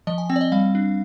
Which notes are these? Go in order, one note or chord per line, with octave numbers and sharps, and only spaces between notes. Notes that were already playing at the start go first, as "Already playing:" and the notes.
F3 D#5
G#5
C4 G5
D5
D#5
G3 F5
D4